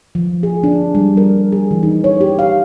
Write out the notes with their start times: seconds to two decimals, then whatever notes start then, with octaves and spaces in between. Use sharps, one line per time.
0.15 F3
0.43 G#4
0.64 D4
0.95 G3
1.17 A#4
1.52 G#4
1.71 E3
1.83 D#4
2.04 C#5
2.21 G4
2.39 F5